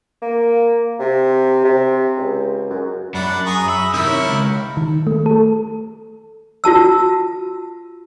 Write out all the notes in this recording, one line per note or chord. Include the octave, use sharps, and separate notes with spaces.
A#3
C3
C3
C#2
F#2
F#2 D4 F#5 B5
G#4 A#5 C#6
E5 B5
C3 D#3 G3 E4 A#4
C#5
C#2
D#3
A3
A4
F4 F#4 A5 E6